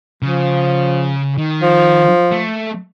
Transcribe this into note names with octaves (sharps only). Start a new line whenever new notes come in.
C#3 F3
D#3
F3
A3